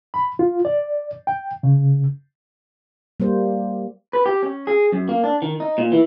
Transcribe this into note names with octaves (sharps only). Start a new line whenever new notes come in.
B5
F4
D5
G5
C#3
G3 A#3 C5
B4
G4
C#4
G#4
F#2
A#3
D4
D#3
D#4
A#2
E3